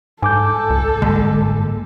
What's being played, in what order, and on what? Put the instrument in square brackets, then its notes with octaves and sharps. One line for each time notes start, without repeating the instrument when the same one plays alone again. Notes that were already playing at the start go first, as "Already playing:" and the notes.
[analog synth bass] G#2 [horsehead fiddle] A4 [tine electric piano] G#5 D6 G6
[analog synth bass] C#2
[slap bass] G1 G#2 A#3 [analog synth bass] G#3